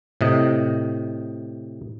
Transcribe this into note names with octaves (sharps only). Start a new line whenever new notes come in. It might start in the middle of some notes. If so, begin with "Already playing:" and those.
A2 C3 D#5